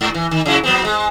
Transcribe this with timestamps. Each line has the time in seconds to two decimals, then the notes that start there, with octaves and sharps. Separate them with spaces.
0.01 G#2
0.14 E3
0.31 D#3
0.46 C#3 F#3 E4
0.64 F#3 B3 C4
0.85 G#3